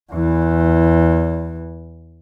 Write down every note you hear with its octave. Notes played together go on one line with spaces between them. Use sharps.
E2 E3